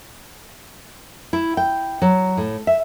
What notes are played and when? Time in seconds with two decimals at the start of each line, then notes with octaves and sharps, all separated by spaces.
1.33 E4
1.57 G5
2.02 F#3
2.37 A2
2.67 E5